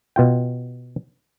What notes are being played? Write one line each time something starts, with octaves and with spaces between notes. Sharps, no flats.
B2 F4 G5